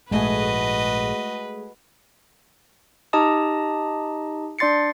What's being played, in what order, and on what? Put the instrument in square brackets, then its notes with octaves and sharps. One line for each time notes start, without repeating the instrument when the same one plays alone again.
[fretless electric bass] A#1 G#2 [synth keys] G#3 A3 G#4 [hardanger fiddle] F#4 D#5 [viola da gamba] B4
[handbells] D#4 G4 D#5 A5 A#5 D#6
D4 D5 C6 A6 C7 C#7